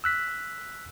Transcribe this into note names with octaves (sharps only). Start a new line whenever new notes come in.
E6 F#6 B6